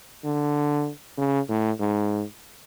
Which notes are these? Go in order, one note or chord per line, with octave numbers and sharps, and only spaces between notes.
D3
C#3
A2
G#2